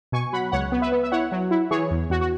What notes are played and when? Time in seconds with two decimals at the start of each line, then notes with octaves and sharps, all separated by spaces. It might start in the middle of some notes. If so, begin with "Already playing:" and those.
0.12 B2 G#5 C#6
0.33 F#3 F#5 B5
0.52 C#2 C#5 F#5
0.72 B3
0.82 B4 E5
0.92 B3
1.03 E5
1.12 E4 C#5 F#5
1.32 F#3
1.51 E4
1.71 E3 G#4 C#5
1.91 E2
2.10 E2 F#4
2.21 F#4